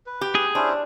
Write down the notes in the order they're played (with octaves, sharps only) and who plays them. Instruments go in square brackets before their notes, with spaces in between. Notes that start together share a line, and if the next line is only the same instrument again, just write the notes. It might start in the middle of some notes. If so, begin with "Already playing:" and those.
[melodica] B4
[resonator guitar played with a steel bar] G4
[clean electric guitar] G#4
[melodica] C#4 E4 C5 [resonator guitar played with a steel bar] D4